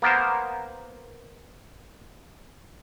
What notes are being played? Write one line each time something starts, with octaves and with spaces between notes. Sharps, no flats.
A#3 B3 A#4 C5